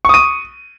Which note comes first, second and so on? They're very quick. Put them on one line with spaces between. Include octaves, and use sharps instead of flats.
C#6 D#6 D#7